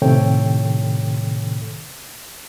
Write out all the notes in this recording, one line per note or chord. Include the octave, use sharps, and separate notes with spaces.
A2 C3 D#3 A4 C#5 G5